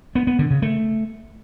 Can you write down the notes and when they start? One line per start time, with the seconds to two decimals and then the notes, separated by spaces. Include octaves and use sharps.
0.15 B3
0.27 B3
0.39 D3
0.51 C#3
0.62 A3